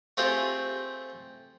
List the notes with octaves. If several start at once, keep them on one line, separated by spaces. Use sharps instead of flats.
A3 C4 F4 G4 G#4